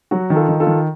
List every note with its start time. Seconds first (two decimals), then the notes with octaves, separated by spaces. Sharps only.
0.11 F#3 F#4
0.30 D#3
0.36 F4 A4
0.49 D#3
0.60 F4 A4
0.67 D#3